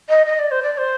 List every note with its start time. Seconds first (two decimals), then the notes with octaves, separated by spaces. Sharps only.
0.09 D#5
0.26 D#5
0.39 D5
0.51 C5
0.63 D5
0.78 C5